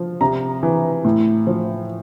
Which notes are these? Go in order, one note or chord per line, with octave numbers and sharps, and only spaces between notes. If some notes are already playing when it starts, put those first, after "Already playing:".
Already playing: F3
C3 A#5
E3
A2
F3